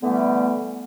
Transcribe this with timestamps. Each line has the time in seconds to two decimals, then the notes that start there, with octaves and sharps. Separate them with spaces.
0.02 D3 E3 G3 A3 B3